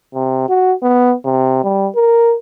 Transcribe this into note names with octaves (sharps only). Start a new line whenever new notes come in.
C3
F#4
B3
C3
G3
A#4